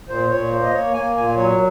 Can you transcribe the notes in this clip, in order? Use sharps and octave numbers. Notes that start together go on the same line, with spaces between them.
A#2 C5
A#2 C#5
A#3 C5
D#5
A#3 C#5
A#3 G#5
A#2 G#5
F#3 C#5